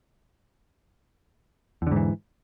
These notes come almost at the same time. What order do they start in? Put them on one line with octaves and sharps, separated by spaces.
E2 D3 G#2 E3